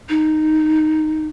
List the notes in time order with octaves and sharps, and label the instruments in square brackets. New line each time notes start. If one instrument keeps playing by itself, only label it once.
[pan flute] D#4